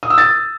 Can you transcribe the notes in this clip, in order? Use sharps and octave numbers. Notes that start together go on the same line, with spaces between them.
D#6
E6
A6